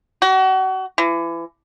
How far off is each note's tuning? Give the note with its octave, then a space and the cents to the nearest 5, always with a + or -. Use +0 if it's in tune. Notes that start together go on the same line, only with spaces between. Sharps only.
F#4 +35
E3 +30